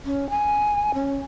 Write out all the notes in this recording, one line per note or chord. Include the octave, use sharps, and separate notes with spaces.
C#4
G#5
C#4